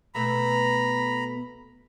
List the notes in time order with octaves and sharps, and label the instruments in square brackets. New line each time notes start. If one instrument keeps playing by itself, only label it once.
[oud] B2 A3 B3 [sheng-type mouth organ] A#5 B5